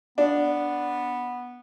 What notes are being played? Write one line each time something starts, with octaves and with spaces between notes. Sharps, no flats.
B3 D4